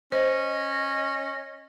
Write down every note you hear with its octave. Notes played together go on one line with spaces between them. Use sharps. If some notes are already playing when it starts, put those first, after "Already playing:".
C#4 C5 D#5